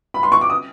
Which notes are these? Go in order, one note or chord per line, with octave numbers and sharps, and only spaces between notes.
B5
C6
C#6
D6
D#6